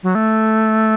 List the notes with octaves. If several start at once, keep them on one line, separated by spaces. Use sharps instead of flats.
F#3
A3